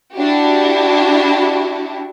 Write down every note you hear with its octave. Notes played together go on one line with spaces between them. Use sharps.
D4 E4 F#4 G4